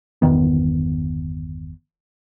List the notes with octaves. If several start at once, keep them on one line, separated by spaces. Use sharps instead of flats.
G1 E2 D#3 B3